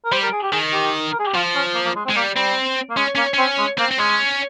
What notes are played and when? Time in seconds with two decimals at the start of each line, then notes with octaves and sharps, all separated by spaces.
0.05 A#4
0.12 G3 C5
0.23 A#4
0.32 G#4
0.43 G4
0.52 D#3 G#4
0.73 G4
1.12 A#4
1.19 G#4
1.27 G4
1.34 F3 F4
1.55 C#4
1.74 A#3
1.85 A#3
1.96 G#3
2.05 C4
2.09 G#3
2.16 G3 A#3
2.35 G3 C4
2.90 A#3
2.97 G#3 C#4
3.15 A#3 C#4
3.34 C4 C#4
3.59 G#3
3.78 A#3 C4
3.91 C4
3.99 G#3 C#4